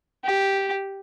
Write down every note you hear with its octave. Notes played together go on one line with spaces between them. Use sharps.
G4